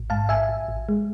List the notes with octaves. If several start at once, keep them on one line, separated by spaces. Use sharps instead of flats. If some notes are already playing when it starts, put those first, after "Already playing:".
Already playing: A1
G#2 F5 A5
A1 E5 G#5
A1
A1
G#3